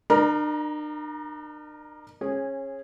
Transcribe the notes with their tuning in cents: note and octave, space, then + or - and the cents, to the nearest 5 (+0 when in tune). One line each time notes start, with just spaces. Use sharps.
D4 +45 A#4 +0 A#5 +30
C#4 -25 G#4 -10